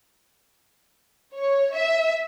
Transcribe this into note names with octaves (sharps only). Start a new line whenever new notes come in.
C#5
E5